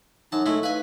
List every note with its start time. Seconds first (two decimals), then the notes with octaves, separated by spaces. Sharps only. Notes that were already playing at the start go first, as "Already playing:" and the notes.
0.32 F#2 D#4 A5
0.46 G#3 A3 E4
0.63 B4 F5 G#5